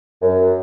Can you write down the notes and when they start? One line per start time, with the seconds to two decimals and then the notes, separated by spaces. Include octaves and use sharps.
0.22 F#2